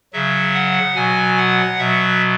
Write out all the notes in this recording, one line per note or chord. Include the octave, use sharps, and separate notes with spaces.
C#3 F#3 E5
F#5
B2 F#3 G#5
F#5
B2 F#3 E5